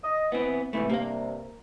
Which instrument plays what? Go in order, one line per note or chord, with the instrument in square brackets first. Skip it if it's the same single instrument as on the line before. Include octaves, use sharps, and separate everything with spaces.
[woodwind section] D#5
[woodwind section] E3 [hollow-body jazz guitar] B3 C4
[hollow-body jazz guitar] G#2 C3 A3 [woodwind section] E3
[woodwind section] G2 C3 [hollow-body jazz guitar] A#3 F5